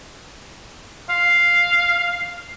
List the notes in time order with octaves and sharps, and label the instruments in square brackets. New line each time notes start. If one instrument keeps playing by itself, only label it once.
[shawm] F5